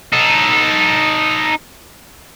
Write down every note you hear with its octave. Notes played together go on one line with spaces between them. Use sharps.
D#4 A4